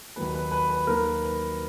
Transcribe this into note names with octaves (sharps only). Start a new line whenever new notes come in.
D#2 D#3 F#3 A#3 B4
B4
B4
B4
D#2 D#3 F#3 A#3 A#4
B4